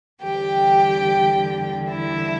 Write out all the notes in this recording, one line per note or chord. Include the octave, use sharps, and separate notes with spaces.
E2 D3 G3 G4 G5
E4 E5